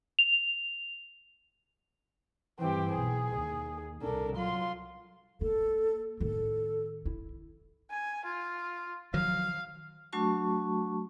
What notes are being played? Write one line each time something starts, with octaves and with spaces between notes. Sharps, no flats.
F7
G2 E3 C4 G4
B1 G#4
D#2
C2 D4 A4 A#4
F#3 F4 C6
A#3 A4
A2 D#3 A4
E4
G#5
F4
D#3 F3 F#3 F5
F#3 A3 D4 F#4 A5 C#6